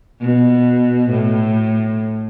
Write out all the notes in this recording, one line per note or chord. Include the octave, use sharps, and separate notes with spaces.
B2
A2